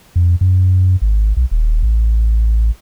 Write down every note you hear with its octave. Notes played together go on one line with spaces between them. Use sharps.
F2
F#2
G#1
B1
D#1
A1